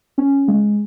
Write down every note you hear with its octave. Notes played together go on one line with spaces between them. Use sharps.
C#4
G#3